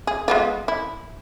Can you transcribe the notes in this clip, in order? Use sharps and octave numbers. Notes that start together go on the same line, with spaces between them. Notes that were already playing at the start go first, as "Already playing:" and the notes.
G#4
G#3 B3 F4
E4